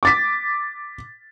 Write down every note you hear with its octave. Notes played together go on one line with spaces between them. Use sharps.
D6 A6 B6